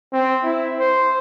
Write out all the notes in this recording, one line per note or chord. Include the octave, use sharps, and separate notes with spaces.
C4
E4
C5